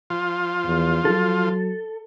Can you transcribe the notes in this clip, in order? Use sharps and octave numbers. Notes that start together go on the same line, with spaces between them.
F3 F4
E2
F#3 A4